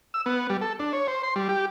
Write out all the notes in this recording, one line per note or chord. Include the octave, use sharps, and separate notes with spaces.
E6
B3
G3
A4
D4
C#5
C5
C6
G3
G4